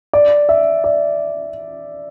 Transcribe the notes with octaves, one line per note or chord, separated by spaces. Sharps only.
D5
E5
D5